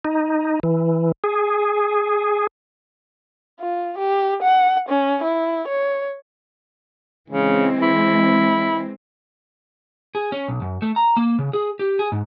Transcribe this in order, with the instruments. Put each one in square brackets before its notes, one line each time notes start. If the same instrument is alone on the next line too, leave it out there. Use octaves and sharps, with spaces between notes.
[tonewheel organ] D#4
E3
G#4
[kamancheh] F4
G4
F#5
C#4
E4
C#5
[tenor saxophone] C#3 [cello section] E3 G#3 C4
[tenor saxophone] E4
[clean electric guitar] G#4
C#4
B1
F#2
A3
A#5
A#3
C#3
G#4
G4
G#4
G#2